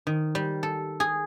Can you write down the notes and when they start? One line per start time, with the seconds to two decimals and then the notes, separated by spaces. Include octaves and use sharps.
0.07 D#3
0.35 G3
0.63 A4
1.00 G#4